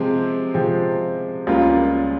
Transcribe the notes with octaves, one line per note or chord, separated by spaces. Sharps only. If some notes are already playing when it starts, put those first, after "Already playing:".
Already playing: C3 F3 G#3 C4
C3 F3 G#3 C4
C#2 C#3 G3 A#3 F4